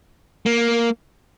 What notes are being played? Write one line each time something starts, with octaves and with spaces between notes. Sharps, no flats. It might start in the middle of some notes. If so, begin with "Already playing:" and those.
A#3